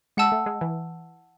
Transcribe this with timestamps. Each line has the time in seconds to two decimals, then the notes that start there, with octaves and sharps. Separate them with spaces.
0.17 G#3 F#5 A5 E6
0.32 A3
0.46 G#3
0.61 E3